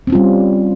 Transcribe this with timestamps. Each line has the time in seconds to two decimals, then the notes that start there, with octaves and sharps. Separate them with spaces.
0.07 C4
0.10 C#4
0.12 F4
0.15 G3